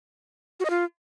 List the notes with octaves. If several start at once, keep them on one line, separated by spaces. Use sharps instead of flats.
F#4
D#5
F4